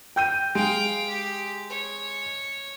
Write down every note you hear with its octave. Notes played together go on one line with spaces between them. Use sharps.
G5 G6 D#7
G#3 F5 G5 D7
G4
C#5